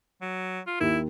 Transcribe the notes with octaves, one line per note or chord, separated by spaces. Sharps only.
F#3
F4
D#2 E4